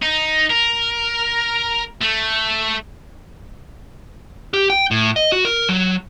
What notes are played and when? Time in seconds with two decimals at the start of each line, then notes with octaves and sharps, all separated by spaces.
0.02 D#4
0.50 A#4
2.01 A3
4.54 G4
4.70 G5
4.91 A2
5.16 D#5
5.32 F#4
5.45 A#4
5.69 F#3